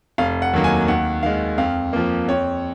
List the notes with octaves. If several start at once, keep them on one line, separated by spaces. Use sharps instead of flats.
F1 F5
F#5
D#2 D#3 F#3 A#3
G#5
D#2 F#5
D#3 G#3 F5
F2 F5
F3 A#3
F2 C#5